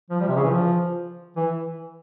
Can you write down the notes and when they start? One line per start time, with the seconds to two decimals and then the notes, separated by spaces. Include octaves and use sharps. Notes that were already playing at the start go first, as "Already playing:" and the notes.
0.10 F3
0.20 G3
0.28 C3
0.35 C#3
0.43 E3
0.50 F3
1.36 E3